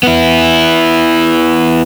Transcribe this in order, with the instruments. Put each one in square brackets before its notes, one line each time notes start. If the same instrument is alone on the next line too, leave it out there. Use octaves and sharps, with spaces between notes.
[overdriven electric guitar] B3 E4